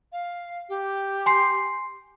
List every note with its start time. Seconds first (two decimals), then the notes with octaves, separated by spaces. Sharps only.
0.13 F5
0.69 G4
1.26 G#5 C6 C7